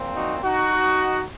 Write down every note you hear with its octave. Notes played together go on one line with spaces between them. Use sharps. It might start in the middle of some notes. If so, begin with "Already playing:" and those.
Already playing: A#2 F3 C4
D#4 F#4
D#4 F#4